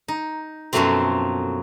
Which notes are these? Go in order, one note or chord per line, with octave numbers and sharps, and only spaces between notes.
D#4
F#2 B2 F3 F#3 A3 C4